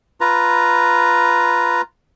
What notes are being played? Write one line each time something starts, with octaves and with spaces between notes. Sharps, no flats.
F4 B4 A#5